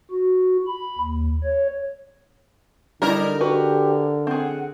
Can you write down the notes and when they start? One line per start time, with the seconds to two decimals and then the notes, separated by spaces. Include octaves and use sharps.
0.11 F#4
0.67 B5
0.99 D#2
1.44 C#5
3.02 D3 G3 D#4 E4 A#4 D5
3.41 F#4 G4 B4
4.27 C4 G#4 F#5